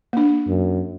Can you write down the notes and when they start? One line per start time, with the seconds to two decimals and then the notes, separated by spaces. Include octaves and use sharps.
0.13 A#3 D4
0.47 F#2